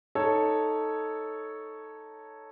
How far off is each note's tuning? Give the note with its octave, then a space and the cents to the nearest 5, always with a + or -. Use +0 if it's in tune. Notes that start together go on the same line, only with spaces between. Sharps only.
D#4 +0 A4 +0 C#5 +0